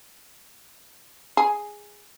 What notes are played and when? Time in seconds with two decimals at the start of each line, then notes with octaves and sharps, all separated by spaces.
1.37 G#4